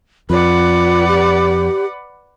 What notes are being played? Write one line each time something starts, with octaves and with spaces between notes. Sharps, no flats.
F2 F4 B4 D5 F#5
G4